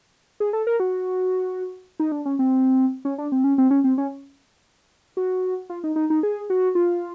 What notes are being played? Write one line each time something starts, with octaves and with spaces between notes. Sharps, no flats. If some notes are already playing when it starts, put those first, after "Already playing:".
G#4
A4
A#4
F#4
D#4
D4
C#4
C4
C#4
D4
C4
C#4
C4
C#4
C4
C#4
F#4
F4
D#4
D#4
D#4
G#4
F#4
F4